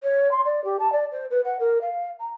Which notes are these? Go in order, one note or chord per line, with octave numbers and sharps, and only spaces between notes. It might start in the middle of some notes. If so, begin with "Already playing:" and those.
C#5
C6
D5
G4
A5
D5
C5
B4
F#5
A#4
F5
A#5